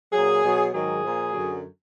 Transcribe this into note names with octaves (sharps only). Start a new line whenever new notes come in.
A#2 F#3 G#4
B2 F#3
G#2 D#3 F#3 G#4
A#2 F3
F#2 D3 F#3